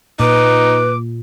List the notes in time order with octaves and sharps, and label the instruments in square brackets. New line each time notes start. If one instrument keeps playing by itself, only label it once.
[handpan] A#2 [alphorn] D#4 [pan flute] B4 [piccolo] D6